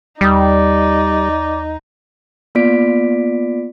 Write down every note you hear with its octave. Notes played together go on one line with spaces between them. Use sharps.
D#2 G3 D#4 D5 D#6
A#3 B3 F4 D5 B6 D7